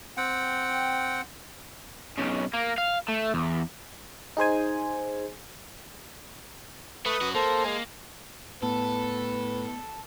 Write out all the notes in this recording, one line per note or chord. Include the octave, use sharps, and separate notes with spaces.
C4 F#5 G5
B1 C#3
A#3
F5
A3
E2
D#4 G#4 C5 G#5
A3 B4 D#6
C#4 F#4
A#3 A4 C5
G#3 G#5
A2 B3 A4 B4